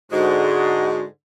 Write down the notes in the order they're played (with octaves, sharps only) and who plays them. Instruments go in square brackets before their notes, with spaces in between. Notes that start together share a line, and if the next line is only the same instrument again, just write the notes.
[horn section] G#2 D3 G#3 [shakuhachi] F#4